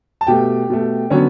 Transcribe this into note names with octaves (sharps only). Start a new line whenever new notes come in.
A5
B2 A3 G4 G5
B2 A3
D3 F#3 B3 C#4 C#5